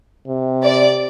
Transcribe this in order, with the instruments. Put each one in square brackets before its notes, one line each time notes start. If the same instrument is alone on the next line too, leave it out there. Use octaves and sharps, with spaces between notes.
[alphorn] C3
[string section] D5